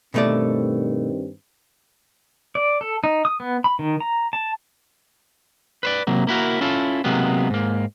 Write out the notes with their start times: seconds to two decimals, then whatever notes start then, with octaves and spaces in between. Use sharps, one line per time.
0.14 G2 B2 D#3 A3 C4 D5
2.55 D5
2.81 A4
3.04 D#4
3.25 D#6
3.40 B3
3.64 B5
3.79 D#3
4.00 A#5
4.33 A5
5.83 B4 C5 D5
6.07 C3 F#3 A#3
6.27 A#3 E4 F#4 A#4
6.61 C#4 E4 F4 A4
7.04 C3 F#3 G#3 A#3 B3
7.50 G#2 A#3